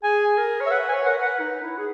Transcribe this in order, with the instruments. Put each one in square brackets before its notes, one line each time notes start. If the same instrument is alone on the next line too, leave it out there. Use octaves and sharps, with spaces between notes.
[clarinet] G#4 [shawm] G#5
[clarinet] A#4
C#5
[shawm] E5
[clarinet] B4 [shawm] F#5
[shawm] G#5
[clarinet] C#5
[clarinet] A#4 [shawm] F#5
[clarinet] B4
[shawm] F#5
[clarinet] D#4
E4
G#4